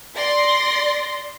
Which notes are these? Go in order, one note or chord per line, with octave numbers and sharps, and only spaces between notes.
D5 C6 A#6